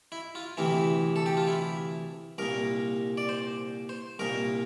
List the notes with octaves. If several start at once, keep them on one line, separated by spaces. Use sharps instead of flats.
E4
F4
D2 C3 E3 E4
A4
G4
F4
E4
C2 A#2 A#4
D5
C5
C5
C2 A#2 A#4